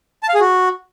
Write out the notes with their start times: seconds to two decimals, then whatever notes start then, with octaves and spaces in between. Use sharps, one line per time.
0.23 A5
0.29 F5
0.35 G#4
0.40 F#4